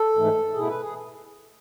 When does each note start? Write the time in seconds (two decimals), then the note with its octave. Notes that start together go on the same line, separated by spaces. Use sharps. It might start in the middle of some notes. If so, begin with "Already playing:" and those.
Already playing: A4
0.15 G#2 E3 A3
0.54 B2 A3 E4 G#4
0.68 B4
0.80 G#4